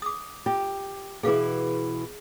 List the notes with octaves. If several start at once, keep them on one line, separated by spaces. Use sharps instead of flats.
D6 D#6
F4 G4
B2 E3 E4 G#4 F5 D6